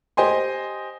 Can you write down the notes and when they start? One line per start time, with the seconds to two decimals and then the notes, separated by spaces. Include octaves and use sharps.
0.17 G4 C5 D#5 G#5 C6